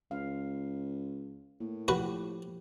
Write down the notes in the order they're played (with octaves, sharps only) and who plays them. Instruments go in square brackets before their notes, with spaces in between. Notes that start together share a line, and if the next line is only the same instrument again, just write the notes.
[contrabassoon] C#2 [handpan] F5
[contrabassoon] A2 [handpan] A#3
[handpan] F3 G4 [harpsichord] F#4 B4